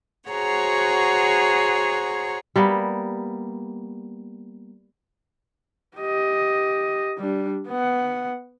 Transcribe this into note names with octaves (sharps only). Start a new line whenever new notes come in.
F#4 G#4 C5 C#5 F#5 A#5
G3 A#3 B3
G4 D#5
G3 D4
B3 F#5